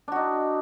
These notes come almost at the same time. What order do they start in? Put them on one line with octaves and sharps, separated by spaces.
D4 F#4 D#4